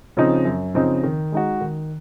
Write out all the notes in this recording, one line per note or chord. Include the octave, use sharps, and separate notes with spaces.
C#3 F3 C4 D#4
F#2
C#3 F3 C4 D#4
D#3
G#3 D#4 F#4
D#3